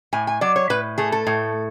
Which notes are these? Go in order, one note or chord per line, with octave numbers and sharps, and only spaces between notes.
A2 G#5
G#5
F#3 D5
C#5
A2 B4
A3 G#4
A4
A2